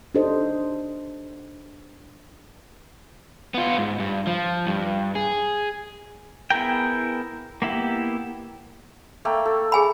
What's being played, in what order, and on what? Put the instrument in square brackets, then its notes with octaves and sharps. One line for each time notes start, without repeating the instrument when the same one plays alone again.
[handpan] D4 D#4 G4 A4 C5 D#5
[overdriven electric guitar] B3 F4
G#2
G2
F3
G2
G#4
[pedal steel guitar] B3 E4 G#4 A#4 G5
A#3 B3 E4 G4
[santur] A3 A#3 G5
A4
[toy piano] G#4 G#5 B5